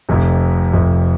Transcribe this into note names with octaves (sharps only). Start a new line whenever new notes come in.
F1 F2 C3
F1 F2 C3